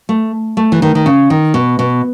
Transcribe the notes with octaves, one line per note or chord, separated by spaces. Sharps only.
A3
A3
E3
D#3
D#3
C#3
D#3
B2
B2